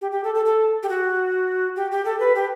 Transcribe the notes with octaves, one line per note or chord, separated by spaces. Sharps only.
G4
G4
A4
A4
A4
G4
F#4
G4
G4
A4
B4
G4